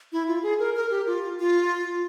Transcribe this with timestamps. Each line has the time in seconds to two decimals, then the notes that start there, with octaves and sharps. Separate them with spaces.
0.12 E4
0.28 F4
0.43 G#4
0.59 A#4
0.75 A#4
0.91 G4
1.07 F4
1.39 F4